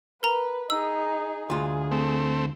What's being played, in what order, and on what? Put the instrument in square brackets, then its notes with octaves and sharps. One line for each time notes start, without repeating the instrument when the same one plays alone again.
[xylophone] A#4 A#5 [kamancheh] B4
[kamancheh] D#4 G#4 [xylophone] E6
[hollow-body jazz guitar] D2 F4 [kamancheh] G#4
[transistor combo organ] A3 C4